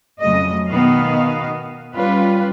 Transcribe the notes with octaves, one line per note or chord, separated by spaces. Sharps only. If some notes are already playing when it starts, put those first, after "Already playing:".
F2 C#3 F#3 A3 D#5
B2 D#3 B3 D#5 F5
G3 C#4 F4 B4